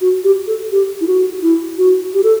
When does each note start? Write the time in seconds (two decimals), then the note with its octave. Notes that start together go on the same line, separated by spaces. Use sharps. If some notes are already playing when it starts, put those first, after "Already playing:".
0.01 F#4
0.24 G4
0.47 A4
0.72 G4
1.01 E4
1.07 F#4
1.42 E4
1.78 F#4
2.14 G4
2.24 A4